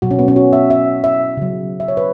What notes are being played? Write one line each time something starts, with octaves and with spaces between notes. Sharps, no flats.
B2 F#3 F#4
C#4
B3
C#4
F#4
E5
E5
E5
C#3 F#3
E5
C#5
B4